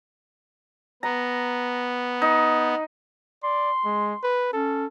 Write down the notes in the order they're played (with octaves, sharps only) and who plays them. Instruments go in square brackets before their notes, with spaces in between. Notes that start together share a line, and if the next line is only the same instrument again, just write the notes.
[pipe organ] B3 [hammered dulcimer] A#5
[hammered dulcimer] D#4
[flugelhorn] D5 [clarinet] C6
[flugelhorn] G#3
B4
[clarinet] C#4 [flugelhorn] A4